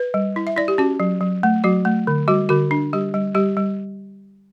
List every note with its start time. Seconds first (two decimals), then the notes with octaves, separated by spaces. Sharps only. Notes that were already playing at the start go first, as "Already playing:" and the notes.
Already playing: B4
0.14 G3
0.36 E4
0.47 E5
0.57 E4 D5
0.68 G4
0.78 C#4 F#4
1.00 F#3
1.21 F#3
1.43 A3
1.64 F#3 F#4
1.85 A3
2.07 D3
2.28 G3 F#4
2.49 D3 F#4
2.71 D4
2.93 G3 G4
3.14 G3
3.35 G3 G4
3.57 G3